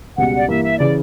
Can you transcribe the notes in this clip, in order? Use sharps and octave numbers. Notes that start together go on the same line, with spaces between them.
C#2 B2 G3 F#5
D5
G2 E3 A#3 E4 E5
E5
C#3 E3 D5